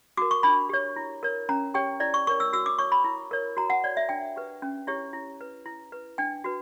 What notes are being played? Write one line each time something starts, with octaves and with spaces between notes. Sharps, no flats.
F#4 A#4 D6
C#6
D4 B5
G4 C#5
E4
A#4 C#5
C#4 A#5
G4 C#5 G5
E4 D5
C#6
A#4 C#5 C#6
E6
F#4 E6
D6
C#5 C#6
B5
E4
A#4 C#5
F#4 A#5
F#5
C#5 D5
E5
D4 G5
G4 B4
C#4
E4 G4 C#5
E4
B4
E4
B4
D4 G5
F#4 B4